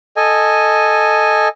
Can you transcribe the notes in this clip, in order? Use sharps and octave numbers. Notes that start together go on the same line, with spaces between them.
A4 D#5 G#5